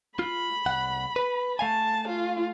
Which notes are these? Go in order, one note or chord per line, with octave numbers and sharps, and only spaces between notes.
F4 B5
C2 F#5
B4
A3 F5 G#5 A5
F4